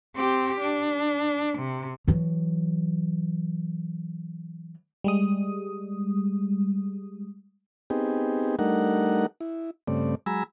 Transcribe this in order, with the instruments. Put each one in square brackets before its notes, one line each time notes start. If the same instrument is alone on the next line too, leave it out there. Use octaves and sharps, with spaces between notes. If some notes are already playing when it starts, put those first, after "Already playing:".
[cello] C4 G4
D4
C3
[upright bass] E3 F#3
[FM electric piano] G3 G#3 D#6
[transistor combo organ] B3 C4 D#4 G4 G#4
G3 A3 D4 D#4 A#4 F#5
E4
G2 C#3 A3 C4 D5
F#3 G#3 G#5 A#5 B5 E6